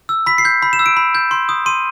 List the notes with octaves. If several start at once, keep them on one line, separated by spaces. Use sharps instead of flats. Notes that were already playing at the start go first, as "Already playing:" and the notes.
E6
B5 B6
C7
G6
B5
E7
E6
D7
B5
G6
C6
D#6
C6 D#7